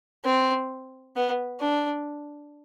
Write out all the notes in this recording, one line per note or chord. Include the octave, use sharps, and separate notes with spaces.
C4
B3
D4